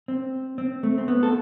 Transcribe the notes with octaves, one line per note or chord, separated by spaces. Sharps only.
C4
C4
A3
C4
B3
A4